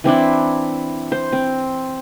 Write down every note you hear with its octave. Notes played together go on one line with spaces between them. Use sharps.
E3 C4 D4 E4
C5
C4